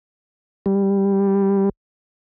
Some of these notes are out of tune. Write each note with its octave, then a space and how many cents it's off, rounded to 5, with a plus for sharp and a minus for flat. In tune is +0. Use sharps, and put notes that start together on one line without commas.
G3 +5